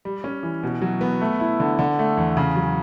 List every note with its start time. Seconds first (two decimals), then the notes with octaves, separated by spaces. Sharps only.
0.05 G3
0.24 C#4
0.43 E3
0.63 B2
0.82 F#3
1.01 B3
1.21 A3
1.40 E4
1.60 D3
1.79 D3
1.99 A3
2.17 E2
2.37 C#3
2.56 F#3